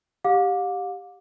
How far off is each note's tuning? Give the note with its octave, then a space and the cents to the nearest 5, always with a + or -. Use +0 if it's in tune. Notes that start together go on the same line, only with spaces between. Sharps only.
G4 +0 F5 +40 D6 +0